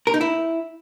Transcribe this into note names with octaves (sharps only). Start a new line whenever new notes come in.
A#4
D#4
E4